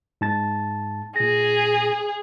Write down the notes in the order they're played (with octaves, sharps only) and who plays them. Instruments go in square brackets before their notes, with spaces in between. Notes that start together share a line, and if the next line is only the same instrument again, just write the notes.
[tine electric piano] G#2 A5 A6
[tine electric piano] A#2 A#6 [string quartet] G#4